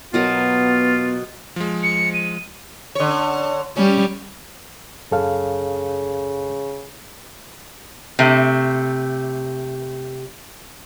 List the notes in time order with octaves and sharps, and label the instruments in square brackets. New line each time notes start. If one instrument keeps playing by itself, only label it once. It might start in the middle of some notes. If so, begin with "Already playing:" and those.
[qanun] B2 F#3 A#4 [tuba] B3 [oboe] F4
[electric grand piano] F3 G#3
[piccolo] C#7
D#7
[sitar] D3 C#5
[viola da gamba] G3 [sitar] C#4
[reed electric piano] F#2 A4 F5 [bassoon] C#3
[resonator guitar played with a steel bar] C3 A3